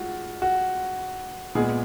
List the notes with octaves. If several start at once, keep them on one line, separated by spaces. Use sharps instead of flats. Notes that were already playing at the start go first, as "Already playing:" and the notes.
Already playing: G#3 F4 F#4
F#4
A#2 G#3 B3 G#4